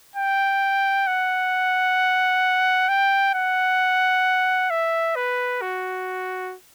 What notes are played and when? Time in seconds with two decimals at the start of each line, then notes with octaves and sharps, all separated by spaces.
0.16 G5
1.07 F#5
2.89 G5
3.34 F#5
4.70 E5
5.16 B4
5.62 F#4